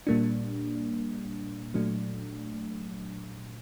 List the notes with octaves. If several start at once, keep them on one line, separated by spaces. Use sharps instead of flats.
A#2 G3 A#3 D4
A#2 F#3 A3 D4